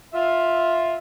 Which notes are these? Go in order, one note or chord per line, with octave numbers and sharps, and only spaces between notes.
F4 E5